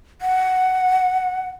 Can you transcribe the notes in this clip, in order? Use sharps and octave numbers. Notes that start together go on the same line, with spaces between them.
F#5